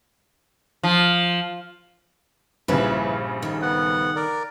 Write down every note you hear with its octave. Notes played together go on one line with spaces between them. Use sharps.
F3
A#1 G2 C#3 E4 G#4 B4
D#3 A4
B3 F#5
A#4 D5